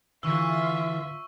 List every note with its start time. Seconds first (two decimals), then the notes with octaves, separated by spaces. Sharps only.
0.23 D3 E3 F4 E5 C#6 E6